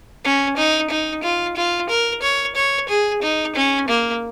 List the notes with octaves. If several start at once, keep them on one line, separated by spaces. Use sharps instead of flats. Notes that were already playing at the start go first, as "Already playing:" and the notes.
C#4
D#4
D#4
F4
F4
A#4
C#5
C#5
G#4
D#4
C#4
A#3